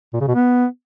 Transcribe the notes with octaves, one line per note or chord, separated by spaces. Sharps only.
A#2
C#3
B2
B3